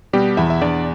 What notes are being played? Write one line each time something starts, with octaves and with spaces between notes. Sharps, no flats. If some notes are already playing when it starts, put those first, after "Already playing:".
B2 G3 G4
E2 E4 E5
E5
E2 D4 D5